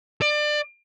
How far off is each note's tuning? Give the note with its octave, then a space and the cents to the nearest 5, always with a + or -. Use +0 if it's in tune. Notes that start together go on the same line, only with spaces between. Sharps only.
D5 +25